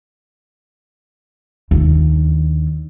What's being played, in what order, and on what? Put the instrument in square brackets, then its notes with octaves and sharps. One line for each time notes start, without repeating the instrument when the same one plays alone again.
[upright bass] D#2 D3